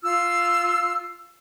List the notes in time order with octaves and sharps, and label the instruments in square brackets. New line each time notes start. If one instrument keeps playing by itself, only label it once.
[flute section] F4 E6 F6